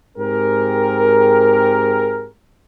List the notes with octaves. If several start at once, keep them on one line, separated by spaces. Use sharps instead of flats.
G#2 C4 G4 G#4 A#4